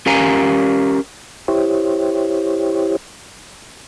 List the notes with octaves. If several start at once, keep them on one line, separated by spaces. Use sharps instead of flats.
C#4 G4 A#4 F5 G#5 A#5
E4 G4 C5 C#5